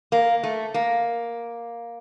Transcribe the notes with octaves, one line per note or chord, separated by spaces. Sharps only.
A#3
A3
A#3